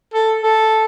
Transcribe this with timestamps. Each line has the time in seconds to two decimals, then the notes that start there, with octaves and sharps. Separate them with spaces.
0.14 A4
0.43 A4